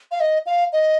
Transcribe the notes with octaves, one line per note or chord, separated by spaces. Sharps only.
F5
D#5
F5
D#5